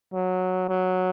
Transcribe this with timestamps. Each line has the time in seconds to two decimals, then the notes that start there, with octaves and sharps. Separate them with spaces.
0.13 F#3
0.69 F#3